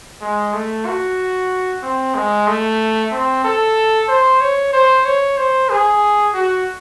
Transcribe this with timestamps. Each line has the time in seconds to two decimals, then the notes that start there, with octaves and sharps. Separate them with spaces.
0.22 G#3
0.54 A3
0.86 F#4
1.83 C4
2.15 G#3
2.47 A3
3.12 C4
3.45 A4
4.09 C5
4.41 C#5
4.73 C5
5.06 C#5
5.38 C5
5.70 G#4
6.34 F#4